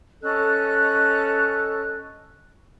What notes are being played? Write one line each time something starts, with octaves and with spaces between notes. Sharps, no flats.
C#4 A4 D#5 F#6